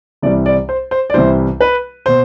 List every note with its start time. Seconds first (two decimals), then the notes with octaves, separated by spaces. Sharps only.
0.22 C2 C3 E3 G3 D5
0.46 D5
0.69 C5
0.91 C5
1.10 D5
1.14 C2 C3 E3 G3 C5
1.61 B4
2.06 B2 C5